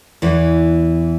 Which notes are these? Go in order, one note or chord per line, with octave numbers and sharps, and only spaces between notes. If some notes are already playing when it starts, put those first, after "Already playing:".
E2 E3